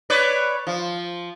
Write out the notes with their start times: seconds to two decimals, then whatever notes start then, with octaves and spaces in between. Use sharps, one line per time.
0.10 B4 C#5 D5
0.67 F3